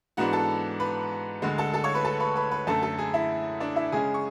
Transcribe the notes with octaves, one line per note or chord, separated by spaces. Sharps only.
G#2 E3 B3 D4 F#4 F#5
A4 A5
B4 B5
D2 D3 G#3
A4 A5
A4 A5
C#5 C#6
B4 B5
A4 A5
B4 B5
B4 B5
B4 B5
F#2 D3 A3 A4 A5
A4 A5
G#4 G#5
E4 E5
D4 D5
E4 E5
C#3 G#3 C#4 G#4 G#5
C#6